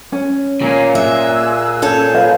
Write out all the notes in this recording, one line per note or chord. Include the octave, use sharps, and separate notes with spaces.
C#4
A#2 C#5 F5 G#5
G#4 E5 E6 F#6
C#4 G#4 A4 C#5 A5 G6
B4 F5